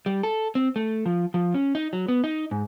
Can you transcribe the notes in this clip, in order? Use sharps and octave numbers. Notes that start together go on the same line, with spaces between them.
G3
A4
C4
A3
F3
F3
C#4
D#4
F#3
B3
D#4
G#2